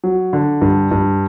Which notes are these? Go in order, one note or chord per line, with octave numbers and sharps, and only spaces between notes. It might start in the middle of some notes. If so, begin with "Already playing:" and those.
F#3
D3
G2
G2